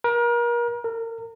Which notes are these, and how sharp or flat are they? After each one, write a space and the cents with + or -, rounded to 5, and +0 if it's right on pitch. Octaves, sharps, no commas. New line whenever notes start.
A#4 +35
A#4 -30